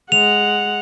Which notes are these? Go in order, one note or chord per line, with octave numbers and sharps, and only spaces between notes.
G#3 F#5 F7